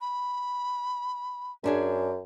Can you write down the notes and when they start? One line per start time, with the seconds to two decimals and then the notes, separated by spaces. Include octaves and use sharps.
0.01 B5
1.64 F#2 C#4 D4 G#4